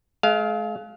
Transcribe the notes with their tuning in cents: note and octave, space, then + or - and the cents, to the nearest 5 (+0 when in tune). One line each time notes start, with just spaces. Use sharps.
G#3 +45 F5 +0